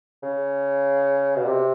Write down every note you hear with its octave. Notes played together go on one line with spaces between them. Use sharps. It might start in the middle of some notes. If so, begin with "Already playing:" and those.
C#3
B2
C3